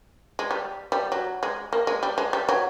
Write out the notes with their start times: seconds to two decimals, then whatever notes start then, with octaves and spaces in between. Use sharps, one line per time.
0.39 G#3
0.51 G3
0.92 G3
1.12 F#3
1.43 G#3
1.73 A#3
1.87 G#3
2.03 G3
2.18 G#3
2.33 G3
2.49 F#3